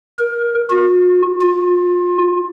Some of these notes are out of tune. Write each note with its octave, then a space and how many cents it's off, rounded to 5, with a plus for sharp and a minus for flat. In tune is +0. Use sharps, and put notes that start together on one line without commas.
A#4 +20
F#4 -45
F4 +30